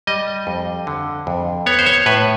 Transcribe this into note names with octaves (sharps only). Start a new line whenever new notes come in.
G3 D#5
F2
D3
F2
B3 C#5
C5
C#5
A2 B4